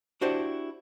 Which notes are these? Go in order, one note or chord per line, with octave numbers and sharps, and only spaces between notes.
D4 E4 F#4 G4 C5 D5